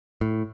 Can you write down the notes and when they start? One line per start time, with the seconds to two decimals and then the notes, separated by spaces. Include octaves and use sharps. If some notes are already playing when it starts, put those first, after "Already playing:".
0.21 A2